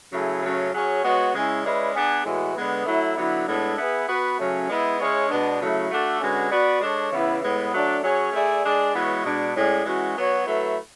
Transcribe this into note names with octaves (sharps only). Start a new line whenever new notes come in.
C#3 F#3 A3 E4 G#4
C#3 F#3 A3 C#4
F#3 C#4 G#4 C#5
G#3 B3 F#4 C#5
C#3 G#3 C#4 E4
G#3 C#4 E4 B4 D5
B3 D4 G#4
A2 E3 G#3 B3 F#4
D3 G#3 B3
F#3 A3 E4
D3 F#3 B3 E4
A2 G#3 B3 D4 A4
B3 E4 G#4 B4
B3 F#4 B4
C#3 F#3 A3 C#4
G#3 B3 E4
G#3 C#4 E4 G#4 C#5
B2 G#3 B3 D4
C#3 F#3 A3 E4
A3 D4 F#4 A4
D3 G#3 C#4 F#4 B4
B3 F#4 B4 D5
G#3 D4 A4 C#5
C#3 E3 B3 E4
A2 G#3 B3
F#3 A3 D4
F#3 C#4 G#4 C#5
A3 E4 G#4 D5
G#3 D4 G#4 D5
E3 G#3 B3 F#4 C#5
B2 G#3 D4
A2 G#3 C#4 G#4 D5
E3 G#3 C#4 F#4
F#3 B3 F#4 C#5
F#3 A3 E4 B4